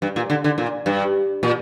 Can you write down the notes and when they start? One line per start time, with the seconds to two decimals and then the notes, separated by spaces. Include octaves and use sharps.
0.02 G2
0.16 A#2
0.30 D3
0.44 D3
0.58 A#2
0.86 G2
1.43 A#2